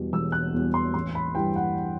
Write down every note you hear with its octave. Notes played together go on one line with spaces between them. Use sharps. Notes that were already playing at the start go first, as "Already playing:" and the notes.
Already playing: E1 E2 B2 G3
E1 E6
F#6
E2 B2 G3
C6
A1 C6
B5
G2 E3 G3 G5
F#5